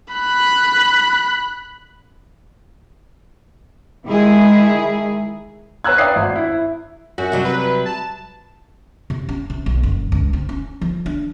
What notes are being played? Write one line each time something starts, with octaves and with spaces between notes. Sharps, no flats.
B5 F#6
D#3 G#3 E4 G#4
B4 C#5 A#5 E6 F#6 G#6
D5 E5 F5 G5 D#6 C7
G#1
E4
F#2 F#4
C3 F#3 G3
B4
A5
C3
C#4
C3
B1
F#1
C#2
C4
C#4
F3
D4